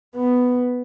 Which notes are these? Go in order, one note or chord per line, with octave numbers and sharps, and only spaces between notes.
B3